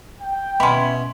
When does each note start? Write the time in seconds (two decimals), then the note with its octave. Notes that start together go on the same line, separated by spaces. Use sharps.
0.21 G5
0.60 B2 C#4 E4 B5 C6